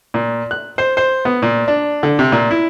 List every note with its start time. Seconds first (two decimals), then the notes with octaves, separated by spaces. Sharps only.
0.14 A#2
0.51 F#6
0.78 C5
0.97 C5
1.25 B3
1.42 A#2
1.68 D4
2.03 D3
2.19 C3
2.32 A#2
2.51 E4